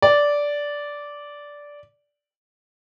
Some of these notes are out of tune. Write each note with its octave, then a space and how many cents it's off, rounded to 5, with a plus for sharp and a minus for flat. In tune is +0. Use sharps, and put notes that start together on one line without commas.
D5 -10